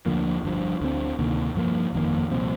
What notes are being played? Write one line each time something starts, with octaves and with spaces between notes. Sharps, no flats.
D2 D3 F3 A#3
G1 G2 F3
D2 D3 F3 C4
D2 C3 D#3 A#3
G2 F3 A#3
G1 F2 D#3 A#3
C2 A#2 F3 C4